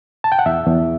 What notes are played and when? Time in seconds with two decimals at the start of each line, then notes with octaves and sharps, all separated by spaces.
0.24 A5
0.32 G5
0.39 F#5
0.46 E2 E5
0.67 E2